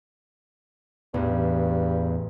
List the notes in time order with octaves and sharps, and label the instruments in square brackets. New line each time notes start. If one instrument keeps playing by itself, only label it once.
[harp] A1 [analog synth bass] E2 [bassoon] G2